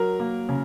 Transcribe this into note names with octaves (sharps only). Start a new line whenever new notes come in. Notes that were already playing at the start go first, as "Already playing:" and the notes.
Already playing: F#3 A#4
A#3
C#3